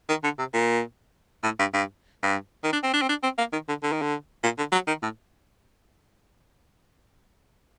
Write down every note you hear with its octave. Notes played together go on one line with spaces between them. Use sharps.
D#3
D3
C3
A#2
A2
G2
G2
G2
D#3
D4
C4
D4
C4
D4
C4
A#3
D#3
D3
D3
D#3
D3
A#2
D3
F#3
D#3
A2